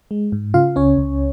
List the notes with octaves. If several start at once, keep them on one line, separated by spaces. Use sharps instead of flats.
G#3
G#2
C#3 F4 F5
C#2 C#4 C#5
C#2